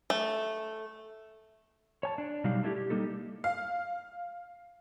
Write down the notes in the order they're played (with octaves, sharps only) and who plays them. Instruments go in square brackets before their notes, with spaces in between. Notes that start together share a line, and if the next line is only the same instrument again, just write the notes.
[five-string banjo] A3
[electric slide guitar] C#5 G#5 A5
D4
B2 F#3 G3 D4 D#4 F5
A3 D4 E4 F#4 G4
G4
G3 A#3 D#4 A4
[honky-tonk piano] F5